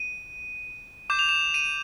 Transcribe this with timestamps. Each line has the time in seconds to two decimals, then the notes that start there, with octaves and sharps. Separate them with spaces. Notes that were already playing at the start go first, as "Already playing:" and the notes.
Already playing: D#7
1.10 D6 G6 E7
1.19 F7
1.29 E7
1.54 D#7